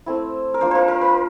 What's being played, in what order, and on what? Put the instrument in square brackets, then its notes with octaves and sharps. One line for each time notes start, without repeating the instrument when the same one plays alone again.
[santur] A3 C4 E4
A#4
F3 A#3 D4 C5
A#4 C5
A#4
A#4